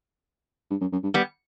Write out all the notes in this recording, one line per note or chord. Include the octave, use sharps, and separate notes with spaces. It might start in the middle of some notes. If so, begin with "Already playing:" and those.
G2
F#2
F#2
G2
G3 B3